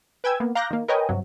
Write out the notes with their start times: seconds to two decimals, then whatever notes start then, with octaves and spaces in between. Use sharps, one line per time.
0.24 B4 G5 G#5 E6 G#6
0.40 A#3 B3
0.55 F5 A#5 D6 F#6 G6 A#6
0.70 D#3 A#3
0.88 A#4 B4 C#5 D#5 G5 G#5
1.09 G2 C3 F#3